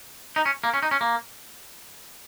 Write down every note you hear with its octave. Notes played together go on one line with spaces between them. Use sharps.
D#4
C#4
A#3
C#4
D#4
C#4
A#3